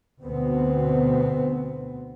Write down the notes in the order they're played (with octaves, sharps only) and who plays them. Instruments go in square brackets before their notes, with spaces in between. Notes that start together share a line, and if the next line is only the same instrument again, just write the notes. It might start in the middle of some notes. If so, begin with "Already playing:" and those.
[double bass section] D2 B2 B3 C4